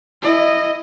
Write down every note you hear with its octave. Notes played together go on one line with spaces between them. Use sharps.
E4 D#5